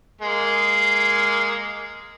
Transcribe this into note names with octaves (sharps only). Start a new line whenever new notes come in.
G#3 A#3